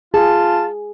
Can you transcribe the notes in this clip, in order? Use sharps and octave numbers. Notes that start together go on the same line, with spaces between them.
F4 G#4 A5